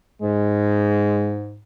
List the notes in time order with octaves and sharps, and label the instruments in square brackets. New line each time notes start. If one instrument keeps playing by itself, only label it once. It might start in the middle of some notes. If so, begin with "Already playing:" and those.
[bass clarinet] G#2 [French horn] G#3